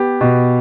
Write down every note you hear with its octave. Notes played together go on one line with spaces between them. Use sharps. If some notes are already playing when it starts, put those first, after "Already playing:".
Already playing: B3 G4
B2